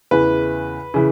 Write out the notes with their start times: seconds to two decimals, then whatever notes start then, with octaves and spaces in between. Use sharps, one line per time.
0.11 E2 C#3 E3 B4
0.94 C#3 E3